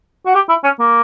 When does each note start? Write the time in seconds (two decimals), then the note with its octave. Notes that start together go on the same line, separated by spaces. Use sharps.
0.26 F#4
0.35 G4
0.49 E4
0.64 C#4
0.80 A#3